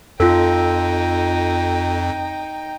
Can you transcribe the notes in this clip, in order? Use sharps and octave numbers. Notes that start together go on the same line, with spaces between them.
F2 D#4 F4 A4 G5